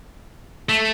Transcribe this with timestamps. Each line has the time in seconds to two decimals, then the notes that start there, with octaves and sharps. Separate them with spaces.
0.69 A3